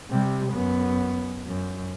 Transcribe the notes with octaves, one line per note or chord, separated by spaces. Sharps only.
C3 G3
F#2 B3
F#2